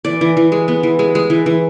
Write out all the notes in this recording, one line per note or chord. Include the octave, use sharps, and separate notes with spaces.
E3 D5
E3
E3
G#3
B3
E3
G#3
G#3
E3
E3